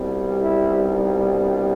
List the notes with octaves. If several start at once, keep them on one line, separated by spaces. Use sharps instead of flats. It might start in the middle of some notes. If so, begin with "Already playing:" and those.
Already playing: C2 B2 G3
E4
D#4
D4